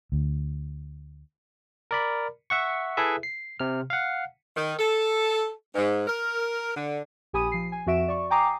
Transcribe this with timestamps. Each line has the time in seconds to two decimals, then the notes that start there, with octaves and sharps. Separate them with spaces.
0.12 D2
1.91 A#4 D5 B5
2.50 E5 F#5 C#6
2.97 E4 G#4 A4 B4 E5
3.23 C7
3.60 C3 F6
3.90 F5 F#5
4.56 D#3
4.79 A4
5.75 G#2
6.07 A#4
6.76 D3
7.33 A#1 G4 G#5 B5 D#6 D#7
7.52 F3 C7
7.72 G#5
7.86 F2 F3 F#4 E5 D7 E7
8.08 D5 C#6
8.30 G5 G#5 A#5 D6 D#6 C7